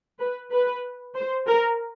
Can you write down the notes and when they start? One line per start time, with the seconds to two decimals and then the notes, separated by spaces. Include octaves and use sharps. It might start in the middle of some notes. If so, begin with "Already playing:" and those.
0.19 B4
0.51 B4
1.15 C5
1.47 A#4